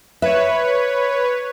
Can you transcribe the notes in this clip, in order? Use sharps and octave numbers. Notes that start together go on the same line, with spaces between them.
B4 C#5 E5